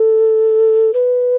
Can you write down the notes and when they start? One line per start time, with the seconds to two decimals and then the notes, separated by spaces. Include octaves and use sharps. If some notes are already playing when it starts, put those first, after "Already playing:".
Already playing: A4
0.94 B4